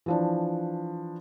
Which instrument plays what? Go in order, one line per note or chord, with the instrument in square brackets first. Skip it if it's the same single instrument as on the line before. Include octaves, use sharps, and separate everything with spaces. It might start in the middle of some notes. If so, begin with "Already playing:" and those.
[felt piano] E3 F3 D4